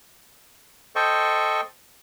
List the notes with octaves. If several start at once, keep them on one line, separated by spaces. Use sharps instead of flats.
A4 C5 D#5 G5 C#6